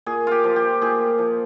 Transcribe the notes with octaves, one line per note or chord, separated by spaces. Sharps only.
A#2 G#4
F4 G4
F3
G4
A#2 G#4
F3